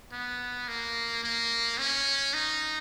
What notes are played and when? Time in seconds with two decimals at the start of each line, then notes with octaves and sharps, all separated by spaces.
0.12 B3
0.68 A#3
1.23 A#3
1.78 C#4
2.34 D#4